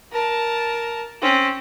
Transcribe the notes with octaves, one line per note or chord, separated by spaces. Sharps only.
A#4 A5
C4 C#4